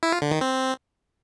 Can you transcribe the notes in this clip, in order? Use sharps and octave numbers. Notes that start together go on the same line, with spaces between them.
E4
F4
D3
D#3
C4